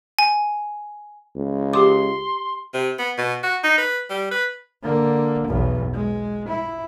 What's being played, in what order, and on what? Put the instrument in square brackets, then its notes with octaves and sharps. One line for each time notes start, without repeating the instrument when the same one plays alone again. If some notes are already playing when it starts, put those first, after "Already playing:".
[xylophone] G#5
[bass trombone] C#2
[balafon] G4 D6 [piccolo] C6
[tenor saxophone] C3
B3
B2
F#4
D#4
B4
G3
B4
[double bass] D3 A#3
B1 E2
G#3
E4